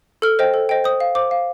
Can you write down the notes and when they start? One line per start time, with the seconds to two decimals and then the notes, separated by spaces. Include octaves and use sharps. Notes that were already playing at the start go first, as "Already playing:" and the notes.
0.22 A4 F6
0.39 C5 D#5 G5
0.54 A4
0.69 C5 D#5 G5
0.84 C5 D#6
1.00 F5
1.15 C5 D6
1.31 F5